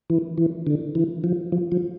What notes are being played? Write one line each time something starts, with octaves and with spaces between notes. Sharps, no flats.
E3
E3
D3
E3
F3
F3
F3